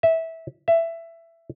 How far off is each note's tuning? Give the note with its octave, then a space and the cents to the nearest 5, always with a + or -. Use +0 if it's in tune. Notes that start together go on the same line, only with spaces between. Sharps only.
E5 -15
E5 +15